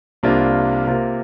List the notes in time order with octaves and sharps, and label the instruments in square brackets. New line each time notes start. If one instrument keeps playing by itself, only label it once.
[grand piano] C2 C3 A#3 D4 F4
C3 A#3 F4 A#4